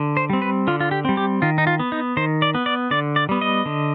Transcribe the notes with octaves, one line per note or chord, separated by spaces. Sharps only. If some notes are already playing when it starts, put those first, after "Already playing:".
Already playing: D3
C5
G3 C4
B4
D3 F4
F4
G4
G3 C4
G4
D#3 F4
D#4
F4
B3
D#4
D#3 C5
D5
B3
D5
D3 D5
D5
G3 B3
D#5
D3